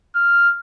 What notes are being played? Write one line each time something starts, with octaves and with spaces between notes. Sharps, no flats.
F6